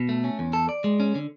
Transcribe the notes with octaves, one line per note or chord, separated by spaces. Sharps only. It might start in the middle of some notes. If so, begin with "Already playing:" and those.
Already playing: B2
A3
C#4
E2
A4
D5
G#3
C#4
D3